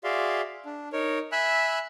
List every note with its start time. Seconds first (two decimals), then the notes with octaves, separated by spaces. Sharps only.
0.04 F#4 G#4 D5 E5 F5 C6
0.65 D4
0.93 D#4 A#4 C#5
1.32 E5 G#5 B5 E6 F#6